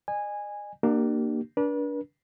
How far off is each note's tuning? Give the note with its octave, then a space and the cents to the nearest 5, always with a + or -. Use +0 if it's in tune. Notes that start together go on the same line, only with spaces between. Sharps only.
D#5 -45 G#5 -15
A#3 +0 D4 +30 G4 -35
D4 -20 B4 -45